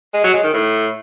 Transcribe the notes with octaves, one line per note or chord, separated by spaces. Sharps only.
G#3
F#3
G#3
D#3
A2